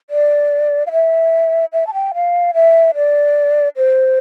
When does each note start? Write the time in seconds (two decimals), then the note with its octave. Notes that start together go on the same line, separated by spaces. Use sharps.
0.10 D5
0.87 F5
0.92 E5
1.73 E5
1.87 A5
1.94 G5
2.14 F5
2.54 E5
2.95 D5
3.77 C5